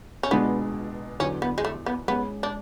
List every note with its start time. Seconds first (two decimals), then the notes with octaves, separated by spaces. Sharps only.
0.23 C#4
0.31 C#2 B2 G#3 B3 D4
1.20 E2 D3 F#3 C#4
1.42 B3
1.58 G#3
1.65 A3
1.86 B3
2.08 G#2 G#3 B3 C#4 G#4
2.43 D4